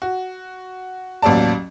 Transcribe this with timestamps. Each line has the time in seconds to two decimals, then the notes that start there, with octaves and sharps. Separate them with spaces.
0.02 F#4
1.22 A1 D#2 F#3 D5 A5